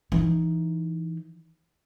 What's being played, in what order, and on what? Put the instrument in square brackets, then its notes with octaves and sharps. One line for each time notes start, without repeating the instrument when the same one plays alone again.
[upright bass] E3 D#4